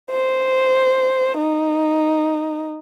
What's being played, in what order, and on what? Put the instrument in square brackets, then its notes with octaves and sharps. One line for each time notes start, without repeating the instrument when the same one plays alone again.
[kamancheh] C5
D#4